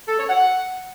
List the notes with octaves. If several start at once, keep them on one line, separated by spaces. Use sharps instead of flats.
A4
C#5
F#5